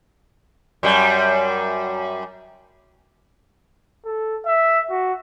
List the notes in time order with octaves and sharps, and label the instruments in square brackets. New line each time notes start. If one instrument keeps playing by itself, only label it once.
[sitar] F#2 G3
[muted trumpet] A4
E5
F#4